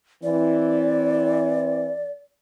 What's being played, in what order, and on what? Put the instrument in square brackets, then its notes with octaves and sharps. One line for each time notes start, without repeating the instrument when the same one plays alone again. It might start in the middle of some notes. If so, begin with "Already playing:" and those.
[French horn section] E3 C4 [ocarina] D5